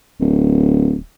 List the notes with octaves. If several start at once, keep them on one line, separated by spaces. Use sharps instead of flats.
D1